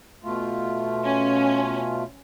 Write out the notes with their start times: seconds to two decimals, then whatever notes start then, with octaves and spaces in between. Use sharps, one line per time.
0.24 B2 A3 F4
1.04 C#4